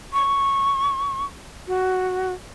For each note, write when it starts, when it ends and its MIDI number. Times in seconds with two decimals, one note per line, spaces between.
0.13 1.25 85
1.67 2.33 66